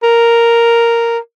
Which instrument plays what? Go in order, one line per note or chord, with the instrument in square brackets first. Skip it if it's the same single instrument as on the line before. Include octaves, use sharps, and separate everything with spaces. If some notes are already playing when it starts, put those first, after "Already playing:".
[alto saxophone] A#4